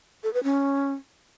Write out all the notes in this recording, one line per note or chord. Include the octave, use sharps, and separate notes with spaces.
A4
B4
C#4